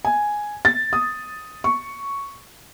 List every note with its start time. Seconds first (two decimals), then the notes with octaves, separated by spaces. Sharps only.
0.05 G#5
0.65 A6
0.93 D#6
1.64 C#6